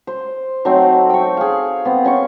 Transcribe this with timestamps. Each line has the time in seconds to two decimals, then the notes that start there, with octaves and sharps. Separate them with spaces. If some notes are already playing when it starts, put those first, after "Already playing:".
0.07 C5
0.65 F#3 A3 C4 D#4
1.10 G5 C#6
1.37 G#4 F5
1.85 B3 C4
2.04 C#4 C6 C#6